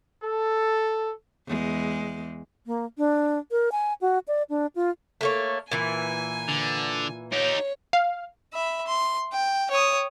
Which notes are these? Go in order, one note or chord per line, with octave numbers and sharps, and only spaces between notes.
A4
E2 G#3
A#3
D4
A#4
G#5
F#4
D5
D4
F4
A3 A#3 C#5
A#2 E3 G#5
D3
D#4 G4 C#5
F5
E5 B5
C6
G5
C#5 D#6